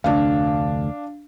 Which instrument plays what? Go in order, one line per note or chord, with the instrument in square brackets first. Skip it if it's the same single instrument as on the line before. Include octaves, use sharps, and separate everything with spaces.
[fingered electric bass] F1 D2 [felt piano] D4 F5